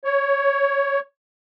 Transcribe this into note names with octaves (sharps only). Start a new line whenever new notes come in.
C#5